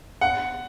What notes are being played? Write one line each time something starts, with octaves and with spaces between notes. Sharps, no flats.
F#5